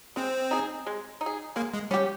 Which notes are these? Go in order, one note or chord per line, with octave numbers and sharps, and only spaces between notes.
G#3 C4
D#4 G#4
G#3
D#4
G#4
G#3 A#3
G#3
G3 C#4 G4